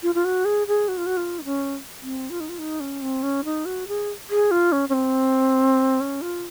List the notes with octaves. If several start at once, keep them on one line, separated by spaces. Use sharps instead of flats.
F4
F4
F#4
G#4
G#4
F#4
F4
F#4
F4
D#4
C#4
C4
F4
D#4
F4
D#4
C#4
C4
C#4
D#4
F#4
G#4
G#4
F4
C#4
C#4
C4
C#4
F4